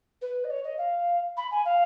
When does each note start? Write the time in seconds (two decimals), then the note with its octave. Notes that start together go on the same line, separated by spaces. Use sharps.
0.21 B4
0.44 D#5
0.50 C#5
0.63 D#5
0.78 F5
1.37 B5
1.51 G#5
1.65 F5